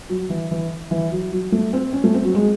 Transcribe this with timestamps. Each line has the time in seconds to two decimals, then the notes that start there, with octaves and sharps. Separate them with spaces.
0.10 F#3
0.30 E3
0.51 E3
0.91 E3
1.12 F#3
1.32 F#3
1.52 A3
1.73 C4
1.93 C#4
2.04 A3
2.14 C4
2.25 F#3
2.35 G#3